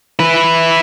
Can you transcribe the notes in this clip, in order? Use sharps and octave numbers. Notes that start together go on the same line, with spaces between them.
E4 B4